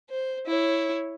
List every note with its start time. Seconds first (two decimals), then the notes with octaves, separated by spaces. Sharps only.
0.10 C5
0.47 E4 C#5